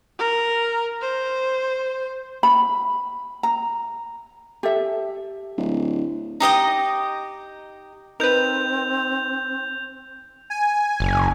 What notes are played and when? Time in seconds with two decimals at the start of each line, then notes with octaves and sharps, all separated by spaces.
0.19 A#4
1.01 C5
2.43 B5
3.43 A#5
4.63 G4 A4 E5
5.58 D1
6.40 D#4 G4 D#5 D#6
8.20 C4 D#4 A#4 B4 G6 F7
10.50 G#5
11.00 F#1